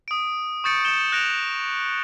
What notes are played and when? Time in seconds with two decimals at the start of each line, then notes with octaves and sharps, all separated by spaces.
0.08 D#6 D7
0.64 C#6 D#6 G6 A6 C#7 D7
0.84 G6 C#7 E7 G7
1.12 F#6 A#6 D7 F7